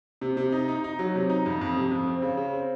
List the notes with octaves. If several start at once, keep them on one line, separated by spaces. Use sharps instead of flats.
C3
C3
D#4
D#4
D#4
F#3
C3
D#4
F2
F2
C3
F2
C4
C#3
C#3
C4